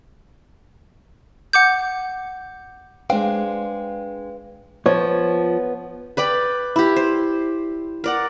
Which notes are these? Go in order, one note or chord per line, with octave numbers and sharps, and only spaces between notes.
F#5 D6 G6
G#3 D4 B4 C5 F5 G5
F3 B3 C#5
B4 D5 G5 B5
E4 G4
C5
A#4 D5 F#5